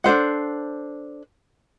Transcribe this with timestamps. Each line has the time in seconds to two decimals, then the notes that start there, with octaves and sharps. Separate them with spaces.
0.04 D4 A4 C5 F#5